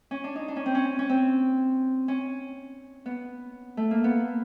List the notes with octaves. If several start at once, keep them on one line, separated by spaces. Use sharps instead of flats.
C#4
D4
D#4
D4
C#4
C4
C#4
C#4
C4
C#4
B3
A3
A#3
B3